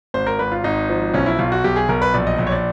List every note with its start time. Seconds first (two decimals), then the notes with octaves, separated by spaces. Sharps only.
0.14 G#1 C5
0.27 A#4
0.39 G#2 B4
0.52 F4
0.64 G#1 D#4
0.90 F3
1.14 B1 C#4
1.26 E4
1.39 B1 F4
1.52 F#4
1.64 B1 G4
1.76 G#4
1.89 B1 A#4
2.02 B4
2.14 A#1 D5
2.27 D#5
2.39 A#1
2.47 C#5
2.52 D5